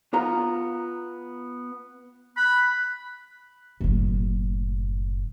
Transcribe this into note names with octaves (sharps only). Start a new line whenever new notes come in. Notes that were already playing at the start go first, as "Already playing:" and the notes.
B3 F4 A#5
B5 F#6
F#1 A2